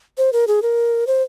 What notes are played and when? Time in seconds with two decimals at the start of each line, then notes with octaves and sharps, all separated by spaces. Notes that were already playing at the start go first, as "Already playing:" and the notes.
0.18 C5
0.32 A#4
0.47 G#4
0.62 A#4
1.07 C5